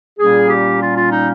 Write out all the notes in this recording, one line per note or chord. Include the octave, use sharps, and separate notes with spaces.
A#2 G3 A#3 C#4 G#4
G4
F4
F4
D#4